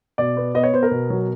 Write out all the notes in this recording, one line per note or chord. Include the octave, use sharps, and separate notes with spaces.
B2 D5
B3
B3 D#5
C#5
B3 C5
A#4
B2
F#3